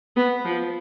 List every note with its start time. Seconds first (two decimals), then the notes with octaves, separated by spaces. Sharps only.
0.16 B3
0.45 F3